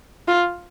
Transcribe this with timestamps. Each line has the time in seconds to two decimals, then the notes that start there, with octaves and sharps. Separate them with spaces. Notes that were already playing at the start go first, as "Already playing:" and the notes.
0.28 F4